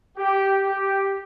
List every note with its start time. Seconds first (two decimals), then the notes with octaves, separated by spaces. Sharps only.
0.18 G4
0.66 G4